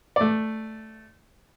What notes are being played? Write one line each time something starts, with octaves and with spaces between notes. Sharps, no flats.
A3 D5